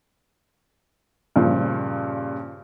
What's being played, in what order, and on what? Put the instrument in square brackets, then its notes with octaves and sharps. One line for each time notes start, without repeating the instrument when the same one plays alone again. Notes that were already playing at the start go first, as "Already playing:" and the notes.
[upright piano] G2 A#2 C#3 F3